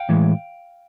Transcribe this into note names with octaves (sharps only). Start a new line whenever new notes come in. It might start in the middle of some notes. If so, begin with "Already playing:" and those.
Already playing: F5 G5
A2 E3 G#3